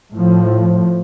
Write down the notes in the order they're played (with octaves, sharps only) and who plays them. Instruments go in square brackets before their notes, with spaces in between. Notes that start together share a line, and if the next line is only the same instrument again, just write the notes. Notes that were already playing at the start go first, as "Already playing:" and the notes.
[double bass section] A2 F3